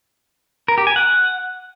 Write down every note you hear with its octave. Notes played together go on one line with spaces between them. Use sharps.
A#4
G4
G#5
F#5